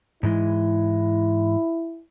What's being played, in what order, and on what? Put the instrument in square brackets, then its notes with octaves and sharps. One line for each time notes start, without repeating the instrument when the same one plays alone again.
[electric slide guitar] G#2 E3 G#3 [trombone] E4